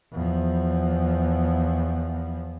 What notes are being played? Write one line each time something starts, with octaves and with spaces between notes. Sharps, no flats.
E2 F3